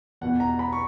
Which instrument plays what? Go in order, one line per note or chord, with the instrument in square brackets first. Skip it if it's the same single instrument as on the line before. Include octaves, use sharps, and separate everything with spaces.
[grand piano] E2 B2 F#5
A#5
B5
C#6